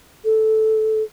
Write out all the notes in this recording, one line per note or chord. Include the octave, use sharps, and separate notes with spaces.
A4